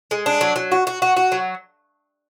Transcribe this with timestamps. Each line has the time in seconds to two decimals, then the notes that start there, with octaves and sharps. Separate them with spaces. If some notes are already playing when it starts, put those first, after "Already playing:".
0.11 G#3
0.26 D4
0.41 F#3
0.56 F#3
0.72 F#4
0.87 F#4
1.02 F#4
1.17 F#4
1.32 F#3